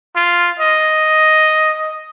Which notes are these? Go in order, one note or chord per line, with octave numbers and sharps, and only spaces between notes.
F4
D#5